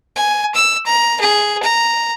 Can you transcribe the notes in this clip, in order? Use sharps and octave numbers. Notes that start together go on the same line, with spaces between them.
G#5
E6
A#5
G#4
A#5